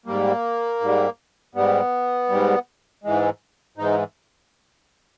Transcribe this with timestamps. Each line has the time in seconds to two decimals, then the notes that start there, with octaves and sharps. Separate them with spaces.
0.06 G#2 G3 A#3
0.81 G#2 G3
1.55 G#2 G3 B3
2.29 G#2 G3
3.04 G#2 E3 G#3
3.77 G#2 E3 G#3 D#4